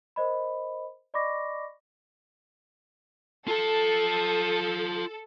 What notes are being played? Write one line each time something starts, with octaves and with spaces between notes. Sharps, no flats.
A#4 C5 D#5 B5
D5 D#5 B5 C#6 D6 A#6
F4 A4 A5